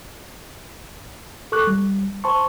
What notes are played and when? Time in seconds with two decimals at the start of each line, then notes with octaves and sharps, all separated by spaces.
1.52 A4 C#6 D6 F#6
1.67 G3
2.24 C5 A5 C6 C#6